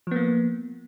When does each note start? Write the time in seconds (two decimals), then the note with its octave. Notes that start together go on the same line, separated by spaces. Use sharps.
0.07 F3
0.11 B3
0.16 A#3